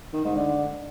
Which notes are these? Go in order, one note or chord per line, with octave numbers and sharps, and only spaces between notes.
D#3
G#2
D3